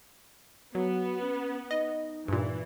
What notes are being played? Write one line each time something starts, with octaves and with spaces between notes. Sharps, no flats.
F#3 B3 F#4
C#4
D#4 D#5
G2 A#2 E3